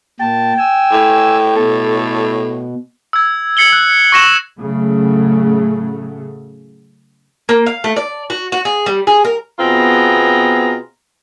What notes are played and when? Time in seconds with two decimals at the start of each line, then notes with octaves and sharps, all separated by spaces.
0.20 A#2 G5 A5
0.58 G#5 E6
0.92 A2
1.57 B2 A4
3.13 E6 G#6
3.57 G#6 C7 C#7 F#7 G7
3.73 F#6
4.12 C#6 A#6 E7 F#7
4.58 A2 C#3 F#3 A3
7.49 A#3
7.66 F5
7.84 A3
7.96 D5
8.30 F#4
8.52 F#4
8.65 G#4
8.86 G3
9.07 G#4
9.25 A#4
9.59 B2 B3 C4 F4 G#4 A#5